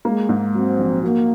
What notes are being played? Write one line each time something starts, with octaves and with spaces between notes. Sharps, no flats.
G#3 A#3
G#2
F#3 C4
A#1
A#3 F#4